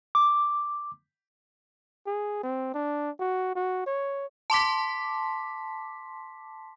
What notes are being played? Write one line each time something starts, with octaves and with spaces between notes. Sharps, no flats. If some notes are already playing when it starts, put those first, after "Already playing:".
D6
G#4
C4
D4
F#4
F#4
C#5
A5 C6 D6 B6